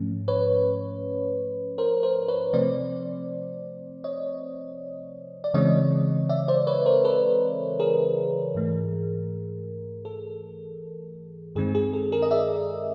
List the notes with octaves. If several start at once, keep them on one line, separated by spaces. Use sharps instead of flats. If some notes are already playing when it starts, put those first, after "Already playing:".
Already playing: G#2 F3 A3 C#4
B4 C#5
A#4 C5
A#4 C5
B4 C#5
C3 F3 A3 C4 C5 D5
C#5 D#5
D5
C#3 E3 G#3 C4 C#5 D#5
D5 E5
C5 D5
B4 C#5
A#4 C5
A4 B4
G#4 A#4
G#2 E3 A3
A4
G2 D#3 G#3 C4 G#4
G#4
A4
G#4 A#4
D#5
D5 E5